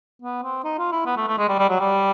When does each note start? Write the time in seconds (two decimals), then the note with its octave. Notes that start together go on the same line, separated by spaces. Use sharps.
0.22 B3
0.43 C4
0.64 D#4
0.78 F4
0.92 E4
1.06 B3
1.17 A3
1.28 A3
1.38 G#3
1.49 G3
1.59 G3
1.69 F#3
1.80 G3